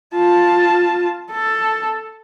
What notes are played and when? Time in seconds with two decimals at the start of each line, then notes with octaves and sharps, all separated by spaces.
0.14 F4 A5
1.31 A4